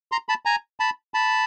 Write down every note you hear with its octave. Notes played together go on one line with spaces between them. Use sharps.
A#5 C6
A5 B5
G#5 A#5
A5 B5
A5 B5